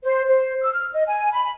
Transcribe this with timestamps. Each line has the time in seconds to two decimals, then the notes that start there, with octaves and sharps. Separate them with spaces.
0.03 C5
0.28 C5
0.61 E6
0.73 F6
0.93 D#5
1.06 G#5
1.32 B5